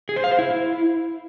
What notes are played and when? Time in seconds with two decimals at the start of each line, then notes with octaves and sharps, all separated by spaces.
0.09 G#4
0.16 C5
0.24 F5
0.31 C5
0.39 E4